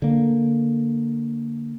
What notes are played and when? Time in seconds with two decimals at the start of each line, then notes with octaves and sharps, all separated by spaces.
0.02 D3 A#3